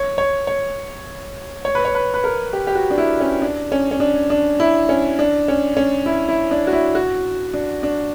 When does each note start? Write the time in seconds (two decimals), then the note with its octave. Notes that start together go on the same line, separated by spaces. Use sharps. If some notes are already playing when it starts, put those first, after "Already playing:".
Already playing: C#5
0.18 C#5
0.47 C#5
1.65 C#5
1.75 B4
1.85 C#5
1.95 B4
2.14 B4
2.24 A#4
2.53 G4
2.67 G4
2.75 F#4
2.90 D4
2.98 E4
3.20 C#4
3.42 D4
3.72 C#4
3.91 C#4
4.00 D4
4.30 D4
4.60 E4
4.89 C#4
5.19 D4
5.48 C#4
5.77 C#4
6.06 E4
6.28 E4
6.51 D4
6.67 F#4
6.73 E4
6.95 F#4
7.54 D4
7.83 D4